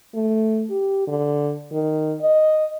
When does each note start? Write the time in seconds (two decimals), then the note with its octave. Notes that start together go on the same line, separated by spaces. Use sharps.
0.14 A3
0.70 G4
1.07 D3
1.72 D#3
2.21 D#5